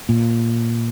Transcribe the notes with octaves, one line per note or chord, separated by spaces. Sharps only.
A#2